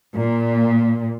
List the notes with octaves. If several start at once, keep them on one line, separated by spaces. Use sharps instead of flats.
A#2